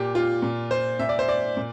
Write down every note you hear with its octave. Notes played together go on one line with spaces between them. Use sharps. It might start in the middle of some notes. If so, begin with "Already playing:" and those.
Already playing: A#2 G4
F4
A#2
C5
A#2 E5
D5
C5
D5
A#2